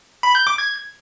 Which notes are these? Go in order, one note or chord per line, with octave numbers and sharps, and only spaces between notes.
B5
G6
D6
G#6